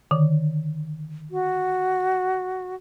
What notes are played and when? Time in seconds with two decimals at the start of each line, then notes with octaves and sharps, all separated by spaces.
0.11 D3 D#3
1.31 F#4